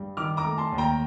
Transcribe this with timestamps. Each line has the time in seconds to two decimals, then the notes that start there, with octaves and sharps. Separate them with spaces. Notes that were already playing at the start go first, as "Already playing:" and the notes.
Already playing: G2
0.17 D#3 D6 F6
0.37 A#5 D6
0.44 A3
0.58 A5 C6
0.72 D#2
0.78 G5 A#5